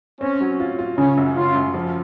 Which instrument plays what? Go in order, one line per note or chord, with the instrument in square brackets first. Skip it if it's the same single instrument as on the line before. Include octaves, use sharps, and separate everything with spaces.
[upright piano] C4 [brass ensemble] C#4
[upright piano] F#3
F4
F4
[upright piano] C#3 [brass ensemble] C#4
[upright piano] F#2
[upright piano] C#3 [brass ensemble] F4
[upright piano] F#2
F3